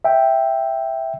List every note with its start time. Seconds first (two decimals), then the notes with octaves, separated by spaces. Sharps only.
0.04 E5 G5